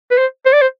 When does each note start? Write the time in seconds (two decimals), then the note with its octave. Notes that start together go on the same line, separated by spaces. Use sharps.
0.11 B4
0.18 C5
0.45 C5
0.53 D5
0.61 C5